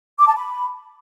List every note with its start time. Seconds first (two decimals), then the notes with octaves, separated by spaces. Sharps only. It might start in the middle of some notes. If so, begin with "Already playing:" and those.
0.18 D6
0.27 A5
0.36 B5